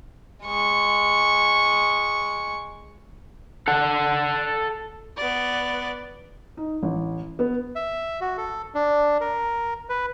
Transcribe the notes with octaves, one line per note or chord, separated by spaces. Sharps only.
G#3 C#6
A4 F#5
B3 D5
D#4
A1
B3
E5
F#4
A4
D4
A#4
B4